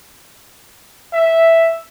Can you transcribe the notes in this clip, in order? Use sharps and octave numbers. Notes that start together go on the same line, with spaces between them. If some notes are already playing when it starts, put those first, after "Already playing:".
E5